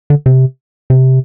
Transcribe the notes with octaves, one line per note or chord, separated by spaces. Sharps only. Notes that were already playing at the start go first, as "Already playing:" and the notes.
D3
C3
C3